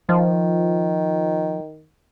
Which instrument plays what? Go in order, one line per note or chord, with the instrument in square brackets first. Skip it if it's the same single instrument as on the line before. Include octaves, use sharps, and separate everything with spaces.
[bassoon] D#3 [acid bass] F3